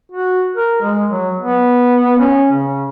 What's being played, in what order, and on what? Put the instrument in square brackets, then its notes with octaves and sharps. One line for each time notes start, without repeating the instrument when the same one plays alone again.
[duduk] F#4
A#4
G#3
F#3
B3
C#4
C#3